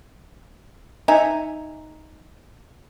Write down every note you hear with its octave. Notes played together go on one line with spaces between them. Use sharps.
D#4 E5 G#5 A#5